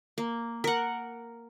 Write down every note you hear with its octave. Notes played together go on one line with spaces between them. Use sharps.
A#3
A#4 F#5